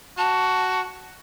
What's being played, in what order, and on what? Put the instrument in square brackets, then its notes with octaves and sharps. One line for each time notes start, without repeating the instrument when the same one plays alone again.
[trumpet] F#4 [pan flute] A5